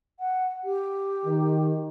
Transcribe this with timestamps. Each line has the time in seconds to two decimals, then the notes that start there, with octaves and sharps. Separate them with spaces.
0.20 F#5
0.64 G4
1.26 D#3